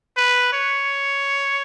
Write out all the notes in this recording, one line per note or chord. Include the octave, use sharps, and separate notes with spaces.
B4
C#5